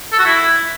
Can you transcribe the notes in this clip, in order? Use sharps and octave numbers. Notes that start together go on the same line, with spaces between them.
A4
F#4
E4